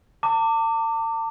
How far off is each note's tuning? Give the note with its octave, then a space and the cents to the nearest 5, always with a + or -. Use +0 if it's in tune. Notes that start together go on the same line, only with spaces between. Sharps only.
A5 +45 D6 +0